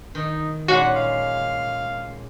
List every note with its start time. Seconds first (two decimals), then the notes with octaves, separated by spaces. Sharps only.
0.15 D#3 D#4
0.68 A#2 G#3 C#4 F#4 F#5
0.96 F5